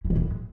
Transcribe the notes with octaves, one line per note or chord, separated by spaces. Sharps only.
E3
D#3
A2